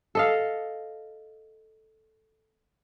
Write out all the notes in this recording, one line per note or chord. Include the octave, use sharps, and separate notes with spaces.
A4 D#5 F5